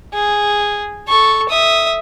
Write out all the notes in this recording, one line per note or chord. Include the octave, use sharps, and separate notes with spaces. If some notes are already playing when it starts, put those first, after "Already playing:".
G#4
A4 C#6
E5 D#6